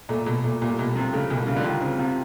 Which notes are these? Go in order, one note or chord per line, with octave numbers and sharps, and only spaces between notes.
A#2 A3
B2 A3
A#2 A3
C2 A#2
C2 B2
C3 F3
C#3 A3
C2 B2
C#3 F4
D3
D#3 F4
C#3 C4
C3 F4